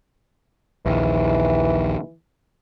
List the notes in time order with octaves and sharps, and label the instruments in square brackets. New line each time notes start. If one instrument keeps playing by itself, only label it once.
[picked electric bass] A#1 D#2 [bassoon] E3